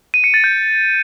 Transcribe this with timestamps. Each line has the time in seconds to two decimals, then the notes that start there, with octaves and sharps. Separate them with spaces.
0.14 D#7
0.24 C#7
0.34 A6
0.44 G6